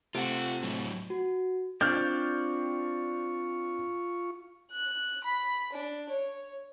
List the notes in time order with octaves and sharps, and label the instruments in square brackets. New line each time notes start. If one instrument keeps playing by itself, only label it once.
[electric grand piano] C3 A3 D7 [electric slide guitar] F4 F#5
[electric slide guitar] A2 F#3
[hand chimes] F#4
[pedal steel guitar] C4 D4 D5 [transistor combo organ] F4 C#6 [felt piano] F6 G6
[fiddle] F#6
B5
D4
C#5